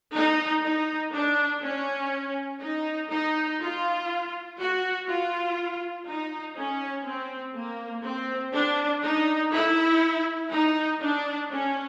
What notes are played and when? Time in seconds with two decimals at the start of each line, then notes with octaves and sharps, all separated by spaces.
0.15 D#4
0.64 D#4
1.13 D4
1.63 C#4
2.62 D#4
3.11 D#4
3.61 F4
4.60 F#4
5.08 F4
6.07 D#4
6.56 C#4
7.06 C4
7.55 A#3
8.04 C4
8.53 D4
9.03 D#4
9.53 E4
10.52 D#4
11.01 D4
11.50 C#4